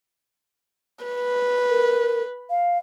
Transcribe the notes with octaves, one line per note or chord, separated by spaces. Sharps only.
B4
A#4
F5